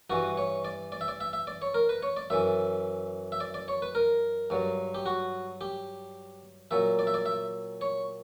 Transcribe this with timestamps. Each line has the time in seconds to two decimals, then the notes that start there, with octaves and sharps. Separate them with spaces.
0.10 G2 E3 F#4
0.37 C#5
0.65 D5
0.92 D5
1.01 E5
1.08 D5
1.21 E5
1.33 E5
1.47 D5
1.62 C#5
1.74 A#4
1.89 B4
2.03 C#5
2.17 D5
2.30 F#2 E3 E5
3.32 E5
3.40 D5
3.54 D5
3.68 C#5
3.82 B4
3.95 A#4
4.50 G2 F#3
4.95 G4
5.06 F#4
5.61 G4
6.71 A#2 F#3 E5
6.99 D5
7.07 E5
7.14 D5
7.26 E5
7.81 C#5